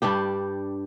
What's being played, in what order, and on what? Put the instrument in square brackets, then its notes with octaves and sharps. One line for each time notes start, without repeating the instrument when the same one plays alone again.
[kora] G2 G3 D4 G4